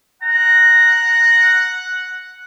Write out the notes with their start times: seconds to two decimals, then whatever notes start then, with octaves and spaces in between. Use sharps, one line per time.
0.22 F#5 A#5